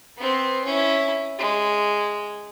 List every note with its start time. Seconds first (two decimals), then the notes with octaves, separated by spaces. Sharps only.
0.17 B3 C4
0.64 C#4 E4
1.39 G#3